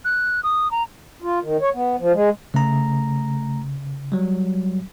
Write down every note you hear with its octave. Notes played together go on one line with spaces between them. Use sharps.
F#6
D#6
A#5
F4
D#3
C#5
B3
F3
G#3
C#3 A3 A#5
F#3 G3